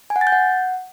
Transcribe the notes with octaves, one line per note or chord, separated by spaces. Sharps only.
G#5
F#5
A6
G6
F#5